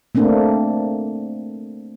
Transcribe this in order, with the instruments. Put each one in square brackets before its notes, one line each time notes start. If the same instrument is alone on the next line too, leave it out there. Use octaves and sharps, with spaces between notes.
[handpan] A3 A#3 C4 D4